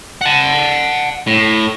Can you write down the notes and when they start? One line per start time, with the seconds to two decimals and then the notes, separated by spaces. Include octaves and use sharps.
0.21 F#5 A5
1.27 A2